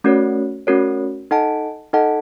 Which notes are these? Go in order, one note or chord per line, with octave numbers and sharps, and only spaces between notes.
A3 C#4 F#4 A#4 C#5
A3 C#4 F#4 A#4 C#5
D#4 A4 D#5 F#5 A5
D#4 A4 D#5 F#5 A5